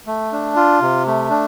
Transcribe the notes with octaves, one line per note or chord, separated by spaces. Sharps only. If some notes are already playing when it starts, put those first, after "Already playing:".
A3
D4
F4
C3
A3
D4